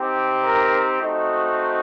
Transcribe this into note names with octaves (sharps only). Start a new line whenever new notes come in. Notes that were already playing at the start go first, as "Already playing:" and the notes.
Already playing: C4 D#4 G4
A#4
A3 C4 D#4 F#4